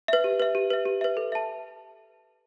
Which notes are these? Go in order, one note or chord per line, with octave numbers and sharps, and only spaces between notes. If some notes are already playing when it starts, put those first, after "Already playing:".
B4 E5
G4
B4 E5
G4
B4 E5
G4
B4 E5
A4
E5 A5